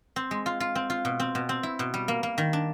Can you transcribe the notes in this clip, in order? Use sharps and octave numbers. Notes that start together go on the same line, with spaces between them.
C4
G#3
F4
F4
C4
F4
B2
C4
B2
C4
E4
B2
G3
A#3
A#3
D#3
D4